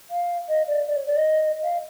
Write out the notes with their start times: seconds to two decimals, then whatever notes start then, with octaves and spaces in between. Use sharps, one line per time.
0.10 F5
0.49 D#5
0.67 D5
0.88 D5
0.96 C#5
1.06 D5
1.16 D#5
1.63 F5